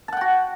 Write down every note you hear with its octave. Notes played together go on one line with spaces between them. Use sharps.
F#4 F#5 G5 A5